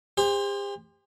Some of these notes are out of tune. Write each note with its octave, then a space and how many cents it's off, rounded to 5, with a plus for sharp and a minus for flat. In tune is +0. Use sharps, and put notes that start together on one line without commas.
G4 +45 C5 +0